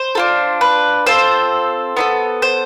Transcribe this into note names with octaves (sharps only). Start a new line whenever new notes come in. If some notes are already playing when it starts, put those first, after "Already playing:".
Already playing: C5
D4 F4 A4
B4
C4 F4 A4 C5
B3 D4 A4
C5